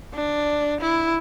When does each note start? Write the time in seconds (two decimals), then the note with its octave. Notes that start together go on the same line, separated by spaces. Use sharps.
0.15 D4
0.81 E4